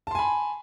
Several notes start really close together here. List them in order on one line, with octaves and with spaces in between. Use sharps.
A5 C6 G#5 B5